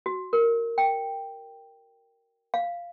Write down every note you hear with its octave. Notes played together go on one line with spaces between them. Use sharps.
F#4
A#4
G5
F5